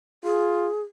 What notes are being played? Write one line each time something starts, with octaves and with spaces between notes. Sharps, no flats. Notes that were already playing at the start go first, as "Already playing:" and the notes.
F4 G#4